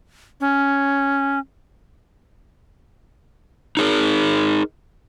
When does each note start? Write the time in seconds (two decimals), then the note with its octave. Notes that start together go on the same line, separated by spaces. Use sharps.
0.40 C#4
3.77 D#4 G#4 A#4